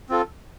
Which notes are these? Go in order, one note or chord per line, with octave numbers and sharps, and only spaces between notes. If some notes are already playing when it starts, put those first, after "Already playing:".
C4 F4 A4